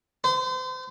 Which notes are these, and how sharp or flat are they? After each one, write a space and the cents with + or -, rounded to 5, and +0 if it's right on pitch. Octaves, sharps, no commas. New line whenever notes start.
C5 -35